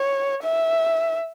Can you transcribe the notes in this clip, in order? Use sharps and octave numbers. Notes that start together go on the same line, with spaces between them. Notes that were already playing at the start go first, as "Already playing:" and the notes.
Already playing: C#5
E5